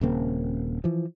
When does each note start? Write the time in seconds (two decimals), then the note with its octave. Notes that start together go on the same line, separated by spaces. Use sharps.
0.01 D#1 C#3 A#3 C4
0.84 E3 F3